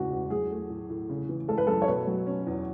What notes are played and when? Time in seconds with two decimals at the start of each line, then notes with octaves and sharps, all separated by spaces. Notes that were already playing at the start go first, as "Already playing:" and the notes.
Already playing: E2 A2 C#3 G#3 F#4
0.12 E2
0.30 F#3 G#4
0.50 A3
0.70 A2
0.89 A2
1.09 C#3
1.29 E3
1.48 G#3 A4
1.58 B4
1.67 F#2 A4
1.82 C#5
1.87 B2 B4
2.07 F#3
2.27 C#4
2.47 E2